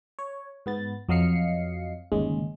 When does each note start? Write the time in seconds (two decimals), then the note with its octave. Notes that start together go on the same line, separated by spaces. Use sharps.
0.19 C#5
0.66 G#2 B3 A6
1.09 F2 F#3 D#5 F5 C7 C#7
2.12 G1 D#2 C#3 G#3